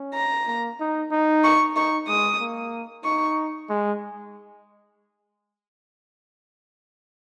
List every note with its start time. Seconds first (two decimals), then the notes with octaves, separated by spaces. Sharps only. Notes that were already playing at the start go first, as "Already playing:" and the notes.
Already playing: C#4
0.15 A#5
0.47 A#3
0.80 D#4
1.11 D#4
1.44 C#6
1.76 D#4 C#6
2.08 G#3 D#6
2.40 A#3
3.05 D#4 C#6
3.70 G#3